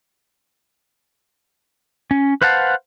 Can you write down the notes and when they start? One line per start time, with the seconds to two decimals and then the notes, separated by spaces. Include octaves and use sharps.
2.11 C#4
2.42 B4 C5 F5 F#5 A5